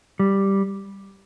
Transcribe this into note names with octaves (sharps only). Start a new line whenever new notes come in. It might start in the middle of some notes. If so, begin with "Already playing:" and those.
G3